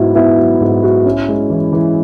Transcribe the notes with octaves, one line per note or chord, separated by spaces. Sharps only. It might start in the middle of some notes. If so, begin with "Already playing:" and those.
Already playing: G#2 F#3 B3 E4 F#4
B3 E4
F#3
G#2
F#4
C#4
G#3
E3
E3